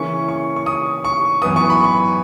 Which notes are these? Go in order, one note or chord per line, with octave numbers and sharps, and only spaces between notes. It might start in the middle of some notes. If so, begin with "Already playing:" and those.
Already playing: C#3 E3 A#3 C#4 E4 C#6
C#6
C#6
D#6
C#6
F#2 E3 B3 D#6
C#6
B5
C#6